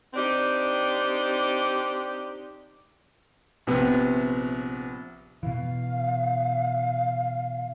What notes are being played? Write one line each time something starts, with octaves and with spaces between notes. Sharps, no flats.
C4 D4 D#4 G4
A#1 C3 B3
B2 E3 F5